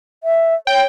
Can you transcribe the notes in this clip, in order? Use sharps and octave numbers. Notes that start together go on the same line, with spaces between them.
E5
C#5 G5